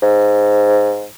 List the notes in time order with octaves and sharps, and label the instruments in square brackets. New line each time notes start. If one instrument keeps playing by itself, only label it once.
[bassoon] G#2